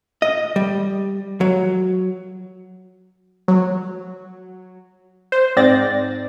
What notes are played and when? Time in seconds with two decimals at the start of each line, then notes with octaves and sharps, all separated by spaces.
0.22 D#5
0.56 G3
1.41 F#3
3.48 F#3
5.32 C5
5.56 G#2 C4 D5 A6 A#6